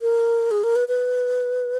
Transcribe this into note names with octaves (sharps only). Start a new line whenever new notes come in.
A#4
G#4
A#4
B4
B4